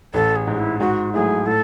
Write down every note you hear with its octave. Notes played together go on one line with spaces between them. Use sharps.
A1 A4
G#4
G#2 G#3
E4
G#2 F#4
F#3 A3 E4 G#4
A2 A4